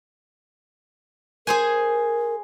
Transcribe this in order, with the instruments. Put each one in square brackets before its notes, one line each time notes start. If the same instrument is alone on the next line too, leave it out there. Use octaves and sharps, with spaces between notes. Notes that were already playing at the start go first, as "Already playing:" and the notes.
[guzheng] G#4 C5 G#5 [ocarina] A#4